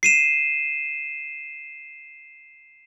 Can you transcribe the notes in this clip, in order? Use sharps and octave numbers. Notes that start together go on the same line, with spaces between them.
C7 D#7 E7